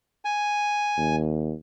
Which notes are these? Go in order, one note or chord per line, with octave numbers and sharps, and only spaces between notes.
G#5
D#2